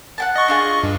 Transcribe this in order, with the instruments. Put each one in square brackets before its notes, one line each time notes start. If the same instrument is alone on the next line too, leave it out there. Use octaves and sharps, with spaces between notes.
[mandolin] F#5 G5 A5
[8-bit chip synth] D#5 C#6
[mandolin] D4 F4 G#4
[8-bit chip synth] G2